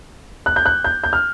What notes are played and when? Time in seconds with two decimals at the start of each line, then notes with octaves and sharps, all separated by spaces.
0.46 F#6
0.56 G6
0.66 F#6
0.84 G6
1.04 G6
1.13 F6